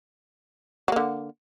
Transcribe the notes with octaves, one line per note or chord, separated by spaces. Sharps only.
D3 F#3 A#3